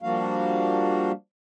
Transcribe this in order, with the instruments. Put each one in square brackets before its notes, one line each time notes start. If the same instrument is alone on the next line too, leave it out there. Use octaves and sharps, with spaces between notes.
[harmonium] F3 G3 A#3 D4 F#4 F5